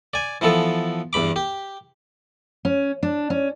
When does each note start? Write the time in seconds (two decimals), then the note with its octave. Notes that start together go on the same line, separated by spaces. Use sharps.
0.14 D5 G#5
0.41 E3 F3 B3 A4
1.13 E2 G2 B5 D6
1.36 G4
2.65 C#4
3.03 D4
3.30 C#4